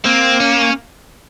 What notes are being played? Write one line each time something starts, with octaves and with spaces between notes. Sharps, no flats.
A#3 C4
C#4